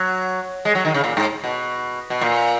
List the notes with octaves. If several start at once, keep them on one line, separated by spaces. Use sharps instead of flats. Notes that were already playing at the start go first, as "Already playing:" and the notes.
Already playing: F#3
G#3
F#3
D#3
C#3
A#2
G#2
B2
B2
A#2